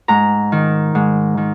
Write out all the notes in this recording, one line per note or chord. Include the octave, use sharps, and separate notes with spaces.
G#2 A#5
D#3
G#2
D#3